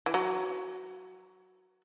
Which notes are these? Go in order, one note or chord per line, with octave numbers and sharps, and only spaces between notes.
E3
F#3